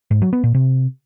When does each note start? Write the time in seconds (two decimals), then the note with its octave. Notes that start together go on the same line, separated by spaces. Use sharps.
0.11 G#2
0.22 F#3
0.33 B3
0.44 A#2
0.55 C3